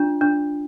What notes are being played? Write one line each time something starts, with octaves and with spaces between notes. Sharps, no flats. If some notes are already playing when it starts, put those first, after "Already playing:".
Already playing: D4 F4
D4